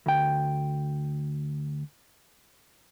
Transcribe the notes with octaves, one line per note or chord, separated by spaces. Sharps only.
D2 G5